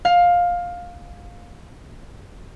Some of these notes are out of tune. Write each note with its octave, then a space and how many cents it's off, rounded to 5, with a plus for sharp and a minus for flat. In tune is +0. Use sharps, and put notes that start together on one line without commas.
F5 +15